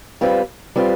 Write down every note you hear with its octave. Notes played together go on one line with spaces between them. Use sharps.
G3 C4 F4 B4
G3 C4 F4 B4